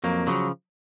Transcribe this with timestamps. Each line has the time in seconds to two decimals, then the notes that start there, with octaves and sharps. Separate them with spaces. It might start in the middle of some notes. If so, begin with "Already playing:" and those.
0.04 F2 F#3 A#3
0.27 C#3 F3 F#3